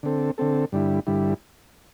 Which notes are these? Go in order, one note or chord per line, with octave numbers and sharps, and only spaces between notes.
D3 C4 A4
D3 C4 A4
G2 D3 G3 E4
G2 D3 G3 E4